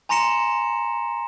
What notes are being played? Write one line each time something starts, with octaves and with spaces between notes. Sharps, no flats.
G#5 A#5 C6 A#6 C#7 E7